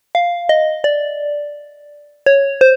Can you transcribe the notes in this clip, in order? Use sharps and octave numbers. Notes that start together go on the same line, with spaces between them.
F5
D#5
D5
C#5
C5